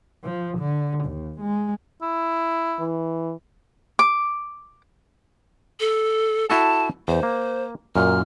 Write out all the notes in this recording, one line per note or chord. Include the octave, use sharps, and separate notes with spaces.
F3
D3
D#2
G#3
E4
E3
D6
A4
E4 F#4 A4 A5
E2 C5
A#3
F#2 A#2 F6